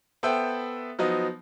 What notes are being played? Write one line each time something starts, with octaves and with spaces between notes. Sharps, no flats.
B3 A4 C5 E5 G5
F3 F#3 B3 D#4